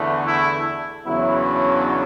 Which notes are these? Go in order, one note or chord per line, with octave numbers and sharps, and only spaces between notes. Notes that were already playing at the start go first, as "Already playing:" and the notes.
Already playing: E2 D3 A3
E4
E2 C#3 F#3 B3 E4
D4